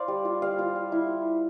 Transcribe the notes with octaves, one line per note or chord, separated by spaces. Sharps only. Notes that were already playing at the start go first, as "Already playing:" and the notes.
Already playing: C5 D5 F5
G3
F4
G3 F5
F4
G3
E4